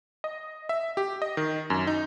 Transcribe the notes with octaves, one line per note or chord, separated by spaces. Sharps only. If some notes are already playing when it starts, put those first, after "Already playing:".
D#5
E5
G4
D#5
D#3
F#2
D#4